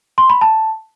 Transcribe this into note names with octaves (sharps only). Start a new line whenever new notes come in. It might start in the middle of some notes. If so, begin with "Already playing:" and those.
C6
B5
A5